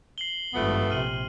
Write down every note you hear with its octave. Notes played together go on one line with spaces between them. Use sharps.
C7 F#7 G7
G#1 G2 F3 A3 B3
A#1 C3 F6 D#7 F#7